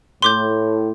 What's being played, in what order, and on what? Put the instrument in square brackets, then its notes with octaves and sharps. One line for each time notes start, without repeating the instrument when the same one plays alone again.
[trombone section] A2 [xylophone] C6 D6 G6